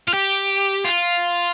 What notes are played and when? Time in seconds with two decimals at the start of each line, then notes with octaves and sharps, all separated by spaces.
0.08 F4
0.13 G4
0.85 F4